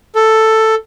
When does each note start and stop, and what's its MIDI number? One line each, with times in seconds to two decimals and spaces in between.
0.15 0.75 69